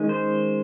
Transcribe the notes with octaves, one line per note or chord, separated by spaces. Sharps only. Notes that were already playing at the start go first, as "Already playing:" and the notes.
Already playing: D#3 G#3 C#4
C5